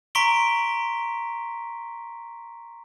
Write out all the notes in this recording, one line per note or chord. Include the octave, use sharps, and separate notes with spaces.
A#5 C6 C#6 B6 D7 G7